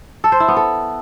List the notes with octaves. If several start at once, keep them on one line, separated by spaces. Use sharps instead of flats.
A4
C5
E4
B3
A4